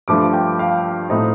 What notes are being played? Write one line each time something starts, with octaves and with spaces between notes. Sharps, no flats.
G2 F3 A3 D6
G5
F5
A2 A3 C4 D#4